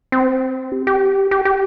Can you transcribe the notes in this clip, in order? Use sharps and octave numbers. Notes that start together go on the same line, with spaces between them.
C4
G4
G4
G4
G4